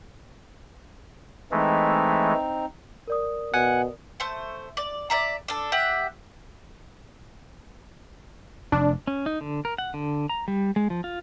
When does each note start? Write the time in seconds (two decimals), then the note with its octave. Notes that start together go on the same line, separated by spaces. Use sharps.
1.51 E3 G#3 A3 C4 D#4
3.07 A#4 D5 D#6
3.54 B2 F#5 G#5
4.20 A3 C5
4.77 D5
5.10 D5 E5 A#5
5.48 D4 A4
5.72 G4 E5 F#5
8.72 F1 D4
9.07 C#4
9.26 D#4
9.41 D3
9.65 A#4
9.78 F#5
9.94 D3
10.29 A#5
10.48 G3
10.76 G#3
10.90 F3
11.04 F4